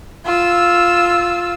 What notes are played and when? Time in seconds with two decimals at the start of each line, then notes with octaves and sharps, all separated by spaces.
0.25 F4 E6